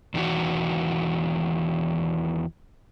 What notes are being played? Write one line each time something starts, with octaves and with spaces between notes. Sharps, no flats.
E2 A2 D#3 E3 F#4